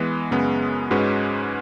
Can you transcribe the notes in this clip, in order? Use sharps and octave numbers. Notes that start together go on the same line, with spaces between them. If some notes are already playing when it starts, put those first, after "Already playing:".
Already playing: E3 G#3 B3
F#2 C#3 G#3 B3
G#2 G#3 C#4 F#4 B4